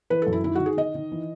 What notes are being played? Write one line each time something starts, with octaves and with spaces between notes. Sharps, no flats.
E3 B4
F#2 A4
E4
D#3 E4
D#3 F#4
G#4
D#3 D#5
D#3
E3